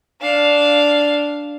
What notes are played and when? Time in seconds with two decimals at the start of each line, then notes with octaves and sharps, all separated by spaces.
0.21 D4 F5